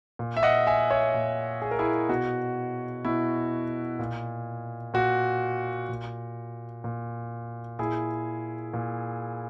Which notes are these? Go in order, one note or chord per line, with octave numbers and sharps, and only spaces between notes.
A#2
E5
D#5 F#5
E5 G#5
C#5 E5
A#2
G#4
A#4
E4 G#4
B2 F#4
B2 E4
A#2
A#2 F#4
A#2
A#2
A#2 E4 G#4
A#2